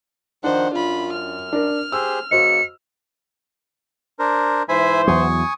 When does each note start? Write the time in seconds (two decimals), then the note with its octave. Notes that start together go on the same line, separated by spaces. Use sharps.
0.44 D#3 F3 D4 C5 F#5
0.75 F#2 F4 B5
1.14 F6
1.53 D4 A#4
1.92 G4 G#4 C5 E6
2.31 C#3 A#3 F#4 C5 D#5 C#7
4.19 D4 A#4 C5
4.69 G#2 E3 C5 E5 G#5 B5
5.07 E2 F#3 G#5 C#6 D#6